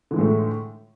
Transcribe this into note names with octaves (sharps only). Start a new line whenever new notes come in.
A2 D3 E3 G#3 A3